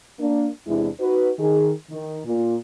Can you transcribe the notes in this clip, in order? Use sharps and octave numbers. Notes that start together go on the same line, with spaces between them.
A#3 D4
E2 C3 G#3 D4 E4
D#4 F#4 B4
D#3 G#4
D#3
A#2